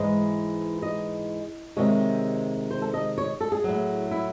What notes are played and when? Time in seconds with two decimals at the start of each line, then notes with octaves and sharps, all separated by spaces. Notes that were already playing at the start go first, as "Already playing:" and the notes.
Already playing: G#2 E3 G#3 D#5
0.82 D#5
1.77 C3 D#3 G#3 C#5
2.71 C5
2.82 A4
2.94 D#5
3.18 C#5
3.41 A4
3.52 G#4
3.64 A2 F#3
4.11 E4